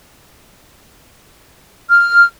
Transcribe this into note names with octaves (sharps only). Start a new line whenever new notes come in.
F6